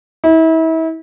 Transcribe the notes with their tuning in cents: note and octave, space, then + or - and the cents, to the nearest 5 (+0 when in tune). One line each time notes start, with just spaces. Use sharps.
E4 -35